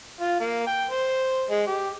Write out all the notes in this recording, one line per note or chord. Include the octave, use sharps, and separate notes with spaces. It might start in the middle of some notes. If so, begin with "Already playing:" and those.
F4
A#3
G5
C5
G#3
G4